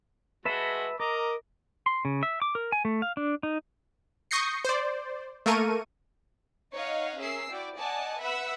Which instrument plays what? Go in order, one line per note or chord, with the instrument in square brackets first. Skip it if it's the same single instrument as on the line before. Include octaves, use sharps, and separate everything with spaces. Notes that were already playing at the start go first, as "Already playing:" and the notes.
[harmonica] G#3 F#4 [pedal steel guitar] B4 E5 A5
[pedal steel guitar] A#4 [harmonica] D#5 A#5 D6
[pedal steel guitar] C6
C#3
E5
D6
A#4
G#5
A3
F5
D4
D#4
[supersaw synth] C#6 D#6 G6 A#6 C7 C#7
C5 D5
A3 A#3 A4 A#4 C#6 D#7
[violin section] D#4 C#5 D#5 F5 F#5
C#4 G#4 A#4 E5 E6 C7
E4 F#4 D5 G5
D5 D#5 F#5 G#5 A5
B4 E5 F#5 B5 E6